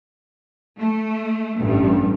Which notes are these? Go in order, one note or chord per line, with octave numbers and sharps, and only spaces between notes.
A3
A1 G2